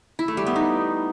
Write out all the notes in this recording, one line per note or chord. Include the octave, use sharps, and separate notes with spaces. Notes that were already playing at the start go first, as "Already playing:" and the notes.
E4
A3
G3
B3
D#4